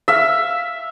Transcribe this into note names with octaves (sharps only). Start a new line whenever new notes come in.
E5 F5